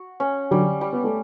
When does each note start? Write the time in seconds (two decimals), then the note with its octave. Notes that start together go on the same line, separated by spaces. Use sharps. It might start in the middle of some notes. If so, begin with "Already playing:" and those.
Already playing: F#4
0.20 C#4
0.51 D3 F#3 G3
0.81 G3
0.93 B3
1.04 A3